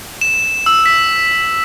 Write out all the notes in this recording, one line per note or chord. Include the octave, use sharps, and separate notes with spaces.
E7
E6
B6